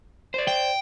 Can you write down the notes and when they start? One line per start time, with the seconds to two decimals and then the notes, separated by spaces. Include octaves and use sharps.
0.34 C5 D5
0.48 G5